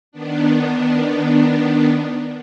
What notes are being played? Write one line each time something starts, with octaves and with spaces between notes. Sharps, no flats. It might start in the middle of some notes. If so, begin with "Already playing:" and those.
D#3 B3 D4